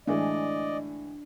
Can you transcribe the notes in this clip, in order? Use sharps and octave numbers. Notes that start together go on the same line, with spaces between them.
A2 E3 G#3 D4 D5 D#5